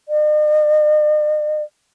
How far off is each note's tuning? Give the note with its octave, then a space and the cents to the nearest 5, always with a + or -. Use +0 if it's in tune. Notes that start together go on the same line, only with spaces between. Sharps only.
D#5 -45